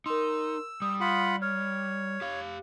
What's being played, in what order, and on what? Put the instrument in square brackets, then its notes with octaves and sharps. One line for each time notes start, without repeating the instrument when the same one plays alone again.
[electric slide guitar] D#4 [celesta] A#4 C6 [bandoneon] E6
[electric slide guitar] G3 [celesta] D#6
[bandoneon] F4 F#5 B5
[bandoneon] C#5 [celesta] F6
[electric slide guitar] G4 F5